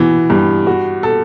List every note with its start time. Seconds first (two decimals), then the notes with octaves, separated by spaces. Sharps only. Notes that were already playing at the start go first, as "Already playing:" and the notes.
Already playing: E3 B3 F#4
0.30 G2
0.67 F#4
1.03 A4